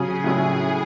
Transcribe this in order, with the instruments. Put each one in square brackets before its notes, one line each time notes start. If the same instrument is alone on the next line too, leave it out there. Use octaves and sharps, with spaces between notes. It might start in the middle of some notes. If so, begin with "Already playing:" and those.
Already playing: [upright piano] C#3 F#3 C#4 [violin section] G#4
[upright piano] A2 F#3 C#4 E4